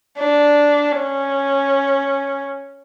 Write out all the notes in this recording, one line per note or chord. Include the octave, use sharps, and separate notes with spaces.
D4
C#4